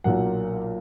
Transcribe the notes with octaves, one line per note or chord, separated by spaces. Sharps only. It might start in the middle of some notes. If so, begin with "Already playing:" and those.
B1 A#2 F#3 A#3 F#5